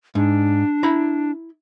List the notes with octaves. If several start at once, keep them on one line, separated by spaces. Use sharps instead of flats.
G#2 D4
E4 A#5 B5